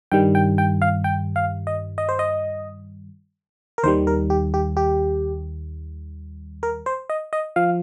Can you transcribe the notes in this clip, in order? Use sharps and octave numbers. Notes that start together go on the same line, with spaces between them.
G2 D#3 G3 G5
G5
G5
F5
G5
F5
D#5
D#5
C5
D#5
A#4
D#2 D#3 G3 C5
A#4
G4
G4
G4
A#4
C5
D#5
D#5
F3 F5